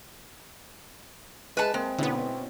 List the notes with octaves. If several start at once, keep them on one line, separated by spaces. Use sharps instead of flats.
G#3 B4 A5
G#3 A#3 C4
B2 D3 B3 C#4 E4